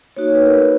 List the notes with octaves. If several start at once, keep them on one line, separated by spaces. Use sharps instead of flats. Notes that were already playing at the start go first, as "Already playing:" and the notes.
A#3 D#4 F#4 C#5
B4
A#4
B4